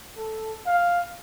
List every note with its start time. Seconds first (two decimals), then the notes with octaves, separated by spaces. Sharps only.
0.17 A4
0.66 F5